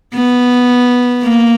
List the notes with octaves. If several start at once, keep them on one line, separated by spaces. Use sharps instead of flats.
B3
A#3